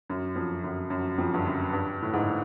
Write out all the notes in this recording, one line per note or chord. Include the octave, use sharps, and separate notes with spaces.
F#2
F2
F#2
F#2
F2
G2
F#2
G2
A2
G#2